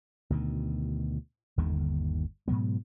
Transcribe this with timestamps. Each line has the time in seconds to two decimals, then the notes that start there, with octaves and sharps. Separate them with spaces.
0.30 D2 B2 D#3
1.57 G1 D#2 D3 D#3
2.48 G#2 B2 F#3 B3